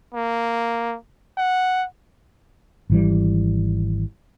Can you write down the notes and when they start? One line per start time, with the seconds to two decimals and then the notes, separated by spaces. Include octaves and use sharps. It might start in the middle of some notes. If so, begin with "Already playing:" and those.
0.14 A#3
1.37 F#5
2.90 G#1 E3 G3